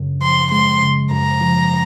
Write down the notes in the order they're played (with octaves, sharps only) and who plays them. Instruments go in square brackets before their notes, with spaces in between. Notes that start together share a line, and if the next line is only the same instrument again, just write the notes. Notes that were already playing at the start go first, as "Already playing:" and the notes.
Already playing: [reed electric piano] F#2 C#3
[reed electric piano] F3 [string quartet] C6
[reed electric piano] G#3 [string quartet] C6
[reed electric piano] C#3
[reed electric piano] F#2 [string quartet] A#5
[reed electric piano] F3